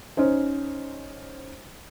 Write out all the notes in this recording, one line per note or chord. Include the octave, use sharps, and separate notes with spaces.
C#4 D#4 C5